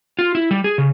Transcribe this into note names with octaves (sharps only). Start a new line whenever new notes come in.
F4
E4
G3
G#4
C#3